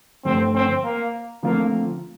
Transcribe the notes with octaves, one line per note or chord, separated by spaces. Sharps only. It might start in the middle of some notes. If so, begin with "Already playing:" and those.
G2 D3 F3 A3 C4
C4
A#3
D3 F3 A3 A#3 C4 F4